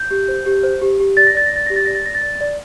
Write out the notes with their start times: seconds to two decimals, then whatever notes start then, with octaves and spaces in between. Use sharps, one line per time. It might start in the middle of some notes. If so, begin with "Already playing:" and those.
Already playing: G6
0.11 G4
0.28 C5
0.46 G4
0.63 C5
0.81 G4
1.00 G4
1.17 D5 A6
1.27 A#6
1.35 D5 A6
1.46 A#6
1.52 D5 A6
1.66 G4 A#6
1.76 A6
1.86 D5 A#6
1.95 A6
2.05 D5 A#6
2.15 A6
2.23 D5
2.41 D5